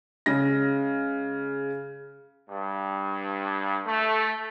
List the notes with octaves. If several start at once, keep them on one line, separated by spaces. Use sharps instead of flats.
C#3 G#3 A#6
G2
A3